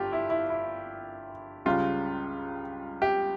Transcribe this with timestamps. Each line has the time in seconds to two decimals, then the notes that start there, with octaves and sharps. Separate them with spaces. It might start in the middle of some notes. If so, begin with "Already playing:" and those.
Already playing: G1 G2 F4 G4
0.12 E4
0.30 E4
0.50 E4
1.65 C#2 C#3 G3 F4
3.02 G4